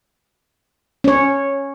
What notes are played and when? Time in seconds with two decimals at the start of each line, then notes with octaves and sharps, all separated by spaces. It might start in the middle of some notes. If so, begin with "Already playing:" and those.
1.04 C#4 C#5